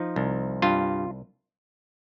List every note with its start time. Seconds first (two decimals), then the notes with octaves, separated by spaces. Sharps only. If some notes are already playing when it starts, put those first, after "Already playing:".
Already playing: F3 D#4
0.16 C2
0.62 G2 F4